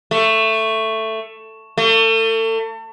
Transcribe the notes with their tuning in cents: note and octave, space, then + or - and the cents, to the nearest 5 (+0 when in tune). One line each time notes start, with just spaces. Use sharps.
A3 +10
A3 +35